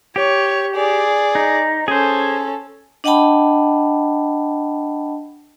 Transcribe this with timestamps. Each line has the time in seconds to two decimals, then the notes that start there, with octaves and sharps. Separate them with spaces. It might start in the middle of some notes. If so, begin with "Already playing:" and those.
0.16 G4 C#5
0.75 G#4 D5
1.35 D#4
1.88 C#4 G#4 A4 C5
3.04 D4 D#5 F#5 G5 A5 B5